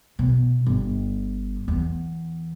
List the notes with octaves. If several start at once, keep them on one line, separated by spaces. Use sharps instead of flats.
B2
G1
E2